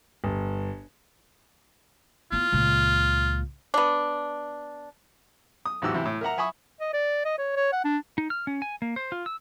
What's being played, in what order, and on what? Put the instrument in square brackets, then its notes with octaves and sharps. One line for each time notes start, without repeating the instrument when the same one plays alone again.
[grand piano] G1
[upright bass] B3 E4 [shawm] F4
[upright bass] C#2 A#2
[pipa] B3 D4
[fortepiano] D#6
A1 E2 G#2 F#4 G4 E6
C3 E3 E4
A2
A#4 E5 F#5 A#5
E5 G#5 B5 C#6 D#6
[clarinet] D#5
D5
D#5
C#5
C#5
F#5
D4
[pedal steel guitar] D#4
F6
C#4
G#5
A#3
C5
F4
E6